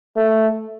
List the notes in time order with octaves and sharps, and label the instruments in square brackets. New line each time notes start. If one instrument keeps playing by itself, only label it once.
[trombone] A3